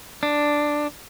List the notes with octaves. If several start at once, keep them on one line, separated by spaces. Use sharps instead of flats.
D4